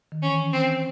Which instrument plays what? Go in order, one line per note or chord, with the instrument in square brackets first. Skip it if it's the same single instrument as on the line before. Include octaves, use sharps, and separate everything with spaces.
[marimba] D#3
[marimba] E3 [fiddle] C#4
[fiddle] C4